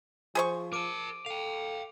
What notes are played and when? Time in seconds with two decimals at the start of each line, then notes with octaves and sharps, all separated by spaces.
0.35 F3 G#4 C5 C#6
0.73 A#4 A5 D6 D7 D#7
1.26 A4 F5 G5 F7